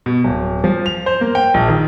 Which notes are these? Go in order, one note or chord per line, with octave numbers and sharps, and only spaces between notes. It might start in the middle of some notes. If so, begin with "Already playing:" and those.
B2
D1
F3
F7
C5
A#3
G5
A#1
D#3